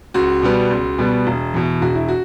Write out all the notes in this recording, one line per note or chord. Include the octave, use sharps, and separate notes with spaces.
C#2 F#4
B2 G3 B3
C#2
B2 G3 B3
E1
E2 B2
E1 F#4
E4
F#4